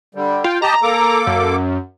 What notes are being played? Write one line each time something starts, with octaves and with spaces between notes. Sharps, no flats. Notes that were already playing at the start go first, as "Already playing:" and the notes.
D3 G3
F4 G5
G4 D#5 A5 A#5
A#3 A4 D6
F#2